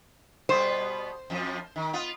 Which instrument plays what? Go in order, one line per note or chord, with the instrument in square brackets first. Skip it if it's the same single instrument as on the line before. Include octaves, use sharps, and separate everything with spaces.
[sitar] B2 G3 B3 [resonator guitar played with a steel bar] C5
[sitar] F2 F3
D#3
B3 F4